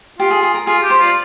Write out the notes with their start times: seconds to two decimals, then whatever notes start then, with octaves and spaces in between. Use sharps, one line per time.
0.19 F4 G4
0.31 G#4
0.43 G#4
0.54 A#4
0.67 F4 G#4
0.82 G4
0.90 C5
0.99 F4 D5